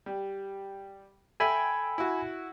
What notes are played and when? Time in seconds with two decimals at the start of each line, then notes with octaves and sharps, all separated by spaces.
0.06 G3
1.40 A4 E5 G5 G#5 B5 G#6
1.98 E4 F#4